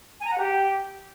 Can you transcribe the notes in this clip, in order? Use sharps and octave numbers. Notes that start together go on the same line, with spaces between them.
G#5
A#5
F#5
G4